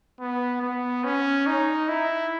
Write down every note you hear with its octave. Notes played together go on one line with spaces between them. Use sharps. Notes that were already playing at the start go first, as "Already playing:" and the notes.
B3
B3
C#4
D#4
E4